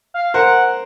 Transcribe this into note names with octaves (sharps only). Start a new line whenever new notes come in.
F5
A#4 C5 F#5